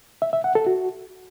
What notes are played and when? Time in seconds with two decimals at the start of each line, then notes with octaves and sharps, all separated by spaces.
0.22 E5
0.33 E5
0.44 F#5
0.55 A4
0.67 F#4